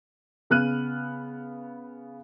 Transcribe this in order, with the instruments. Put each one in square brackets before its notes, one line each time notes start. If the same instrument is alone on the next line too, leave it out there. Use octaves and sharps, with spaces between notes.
[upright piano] C#3 B3 F6 F#6 D#7